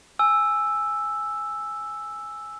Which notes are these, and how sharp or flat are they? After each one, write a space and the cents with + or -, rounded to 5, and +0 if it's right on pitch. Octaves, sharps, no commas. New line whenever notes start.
G#5 +0 E6 +0